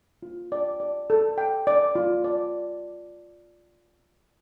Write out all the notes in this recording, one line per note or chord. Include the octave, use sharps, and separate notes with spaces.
F4
D5
D5
A4
G5
D5
F4
D5